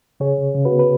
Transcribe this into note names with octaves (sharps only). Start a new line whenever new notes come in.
C#3 G#4 C#5
C#3
C#3
F#4 B4
B3
B4